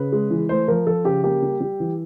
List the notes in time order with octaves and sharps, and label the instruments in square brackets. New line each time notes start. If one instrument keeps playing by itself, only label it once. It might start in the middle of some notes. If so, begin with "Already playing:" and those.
Already playing: [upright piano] C#3 B4
G#3
E3
A3 C5
F3 A#4
F3 A4
C#3 G4
A#3 G4
G3
G3
E3